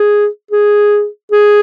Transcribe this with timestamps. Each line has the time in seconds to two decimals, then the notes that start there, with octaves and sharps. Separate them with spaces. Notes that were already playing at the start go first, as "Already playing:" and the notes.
Already playing: G#4
0.51 G#4
1.31 G#4